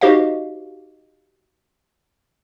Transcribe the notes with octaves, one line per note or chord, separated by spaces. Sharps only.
D#4 F#4 G4 C5 D#5 F5